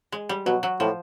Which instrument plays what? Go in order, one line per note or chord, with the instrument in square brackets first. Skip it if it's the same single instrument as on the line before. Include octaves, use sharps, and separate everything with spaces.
[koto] G#3
G3
[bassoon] B2 [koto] F#3
[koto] F#3
[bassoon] A2 [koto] F3